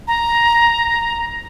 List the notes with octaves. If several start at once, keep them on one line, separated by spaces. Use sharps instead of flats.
A#5